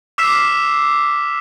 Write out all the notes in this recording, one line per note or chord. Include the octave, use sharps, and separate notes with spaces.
D6 E6 F6 B6 C7 E7